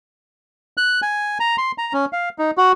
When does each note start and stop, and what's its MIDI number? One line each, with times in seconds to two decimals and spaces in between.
0.77 1.01 90
1.02 1.38 80
1.40 1.56 82
1.58 1.72 84
1.78 1.93 82
1.93 2.05 61
2.13 2.29 77
2.39 2.51 63
2.58 2.72 66